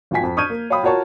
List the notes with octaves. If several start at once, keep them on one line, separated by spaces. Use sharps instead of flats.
G#1 F3 F#4 G5 G#5 B6
F2
C#6 D#6 F6 G6 G#6 D#7
A#3
C#5 F5 G5 B5 D#6
F4 F#4 A#4 C#5 A5 C#6